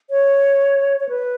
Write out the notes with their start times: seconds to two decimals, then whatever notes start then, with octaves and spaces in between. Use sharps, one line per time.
0.10 C#5
1.00 C#5
1.09 B4